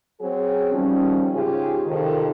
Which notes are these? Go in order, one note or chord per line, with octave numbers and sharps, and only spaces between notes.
F#3 C4 G#4
D#3 F3 G3 C#4
G#2 C#3 F4 G4 G#4
F2 C3 D#3